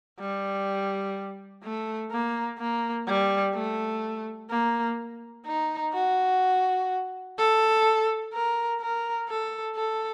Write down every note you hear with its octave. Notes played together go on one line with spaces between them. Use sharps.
G3
A3
A#3
A#3
G3
A3
A#3
D#4
F#4
A4
A#4
A#4
A4
A4